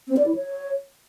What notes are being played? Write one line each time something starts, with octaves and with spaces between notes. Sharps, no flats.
C4
D5
E4
C#5